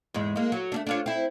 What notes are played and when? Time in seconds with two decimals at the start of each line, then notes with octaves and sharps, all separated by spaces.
0.14 E2 G#2 G#3
0.36 G#3 A#3
0.52 F#3
0.72 A3 C#4 D4
0.87 D4 F4 C#5
1.06 C4 E4